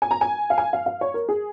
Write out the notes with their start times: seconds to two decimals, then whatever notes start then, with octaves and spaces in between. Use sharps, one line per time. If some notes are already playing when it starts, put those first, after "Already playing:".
0.02 G#5
0.11 A#5
0.21 G#5
0.50 F5
0.58 G#5
0.73 F5
0.86 F5
1.01 C#5
1.14 A#4
1.29 G#4